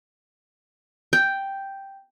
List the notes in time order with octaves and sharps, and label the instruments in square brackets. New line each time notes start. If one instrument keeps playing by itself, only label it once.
[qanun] G5